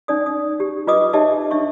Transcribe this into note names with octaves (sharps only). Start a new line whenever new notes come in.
C#4 D#4 D5 D#6
D#6
G4
F4 B4 D#5 D6 D#6
D#4 G4 C#5 D#5 E5 A5
D4 E5 C#6